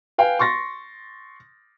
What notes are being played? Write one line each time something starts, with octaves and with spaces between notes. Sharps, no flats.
B4 F5 G5 G#5
C6 C#6 A6 A#6